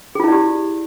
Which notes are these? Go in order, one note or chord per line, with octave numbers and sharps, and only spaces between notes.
E4 F4 G4 G#4 D5